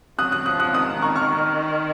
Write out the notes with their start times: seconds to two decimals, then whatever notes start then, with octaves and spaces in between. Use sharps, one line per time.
0.18 F#3 D#6 F#6
0.32 D#6 F#6
0.46 F3 D#6 F#6
0.60 D#6 F#6
0.73 D#3 D#6 F#6
1.02 A#5 C#6
1.16 C#6 F6